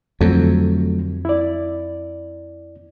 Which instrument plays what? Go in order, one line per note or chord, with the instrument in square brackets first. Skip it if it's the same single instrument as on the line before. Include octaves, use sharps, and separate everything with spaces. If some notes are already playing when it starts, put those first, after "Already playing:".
[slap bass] F2 [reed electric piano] D3 F#3 A3
[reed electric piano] E4 D5